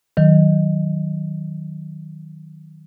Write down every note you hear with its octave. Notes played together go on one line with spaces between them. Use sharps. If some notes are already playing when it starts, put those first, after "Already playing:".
D#3 F#3